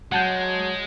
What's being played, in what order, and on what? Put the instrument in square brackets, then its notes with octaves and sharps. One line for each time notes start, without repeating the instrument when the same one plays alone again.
[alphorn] F#3 [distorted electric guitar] G#3 [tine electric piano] F#5 A5 G6